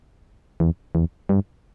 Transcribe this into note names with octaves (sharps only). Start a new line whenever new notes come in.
E2
E2
G2